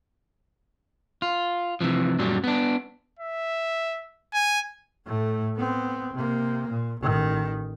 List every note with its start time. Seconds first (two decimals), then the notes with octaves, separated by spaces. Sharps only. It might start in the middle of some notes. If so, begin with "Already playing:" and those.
1.22 F4
1.81 C3 E3 F3
2.19 F#2 A#2 F#3 G3
2.44 B3 D4
3.19 E5
4.34 G#5
5.06 A2 A3
5.57 B3 C4
6.14 C3 A#3
6.70 A#2
7.02 A1 D#3